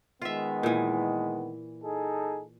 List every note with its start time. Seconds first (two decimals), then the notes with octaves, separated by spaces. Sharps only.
0.22 D#3 G#3 B3 F4 E5
0.63 A#2 E3
1.83 D#4 G#4 A4